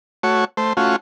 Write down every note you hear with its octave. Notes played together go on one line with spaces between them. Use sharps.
A3 F#4 C#5
A3 C5
A3 C#4 F4 F#4